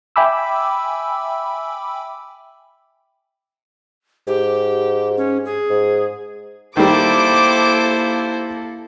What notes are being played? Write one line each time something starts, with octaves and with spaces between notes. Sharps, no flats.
E5 G5 G#5 B5 D6 E6
G#2 G4
C#4
G#4
G#2
D#3 G3 A#3 E4 A4 C5 D6